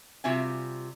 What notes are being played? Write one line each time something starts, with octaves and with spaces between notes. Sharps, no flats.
C3 G3 F4 F#4 E5 G#5